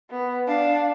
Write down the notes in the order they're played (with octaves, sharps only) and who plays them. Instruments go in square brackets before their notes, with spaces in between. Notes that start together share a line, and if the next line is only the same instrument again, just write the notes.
[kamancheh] B3
[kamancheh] D4 [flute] F5